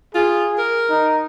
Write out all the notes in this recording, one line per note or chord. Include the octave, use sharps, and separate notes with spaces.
F4 G#4
A#4
D#4